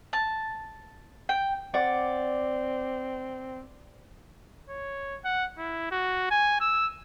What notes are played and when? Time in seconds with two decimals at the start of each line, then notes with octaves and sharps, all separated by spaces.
0.13 A5
1.29 G5
1.74 C4 D5 F#5
4.70 C#5
5.25 F#5
5.58 E4
5.92 F#4
6.31 G#5
6.61 E6